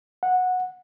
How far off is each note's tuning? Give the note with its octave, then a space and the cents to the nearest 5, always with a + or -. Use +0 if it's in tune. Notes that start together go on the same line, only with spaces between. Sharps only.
F#5 -15